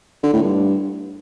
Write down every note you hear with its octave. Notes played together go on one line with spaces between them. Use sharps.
D3
A2
G2